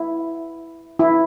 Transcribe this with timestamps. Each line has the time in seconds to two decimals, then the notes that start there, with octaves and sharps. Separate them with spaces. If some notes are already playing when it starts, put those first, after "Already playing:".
Already playing: E4
0.99 E4